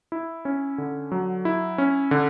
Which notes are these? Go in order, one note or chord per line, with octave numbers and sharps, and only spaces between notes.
E4
C#4
D3
F#3
E4
C#4
D3